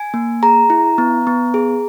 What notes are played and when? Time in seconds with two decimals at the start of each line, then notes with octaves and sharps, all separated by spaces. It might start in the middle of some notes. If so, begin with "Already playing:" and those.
Already playing: G#5
0.14 A#3
0.43 G#4 A#5
0.70 E4
0.98 B3
1.27 B3
1.54 G#4